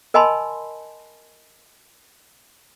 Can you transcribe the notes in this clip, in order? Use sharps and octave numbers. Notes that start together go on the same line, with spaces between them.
A#4 D#5 G#5 A5 B5 C6